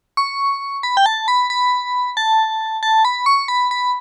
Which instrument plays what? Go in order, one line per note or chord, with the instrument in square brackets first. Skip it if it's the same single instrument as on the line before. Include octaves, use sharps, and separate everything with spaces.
[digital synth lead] C#6
B5
G5
A5
B5
B5
A5
A5
B5
C#6
B5
B5